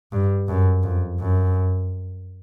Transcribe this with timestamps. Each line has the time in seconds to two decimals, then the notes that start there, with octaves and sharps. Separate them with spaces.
0.12 G2
0.49 F#2
0.84 F2
1.20 F#2